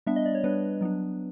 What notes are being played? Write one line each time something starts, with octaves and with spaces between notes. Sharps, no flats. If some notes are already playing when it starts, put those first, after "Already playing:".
G3 B3 D4 E5
D#5
D5
C#5
G3 B3 D4 B4
F#3 B3 D4